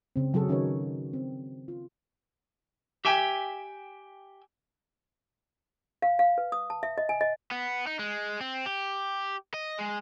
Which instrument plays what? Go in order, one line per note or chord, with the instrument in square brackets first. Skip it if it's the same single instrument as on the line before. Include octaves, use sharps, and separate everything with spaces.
[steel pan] C#3 C4
C#3 F#3 F#4 G#4 A4
D#3 C#4 D#4 A#4 B4 C#5
C4
F4
[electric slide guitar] G4 E5 G5 G#5
[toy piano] F5
F5
B4
D#6
A5
E5
D#5
G#5
D#5
[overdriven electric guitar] B3
D#4
G#3
C4
G4
D#5
G#3